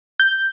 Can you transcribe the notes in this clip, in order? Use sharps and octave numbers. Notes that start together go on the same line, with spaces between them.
G6